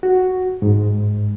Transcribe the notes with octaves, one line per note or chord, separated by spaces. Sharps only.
F#4
G#2